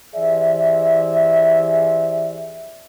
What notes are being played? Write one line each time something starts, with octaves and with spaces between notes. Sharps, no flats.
E3 G4 G#4 C5 D5 E5